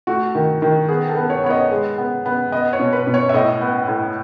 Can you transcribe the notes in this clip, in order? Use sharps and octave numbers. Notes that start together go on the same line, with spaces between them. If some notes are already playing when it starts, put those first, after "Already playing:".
A3 F#4
D#3
D#3
B3 G#4
A4
B3
C#5
B3 C#5
D#5
G#3
B3
B3
B3 D#5
C#5
B2
B4
B2
C#5
E5
A2 D#5
B3
A2